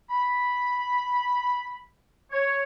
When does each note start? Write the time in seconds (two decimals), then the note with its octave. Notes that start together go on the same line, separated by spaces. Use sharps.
0.10 B5
2.32 C#5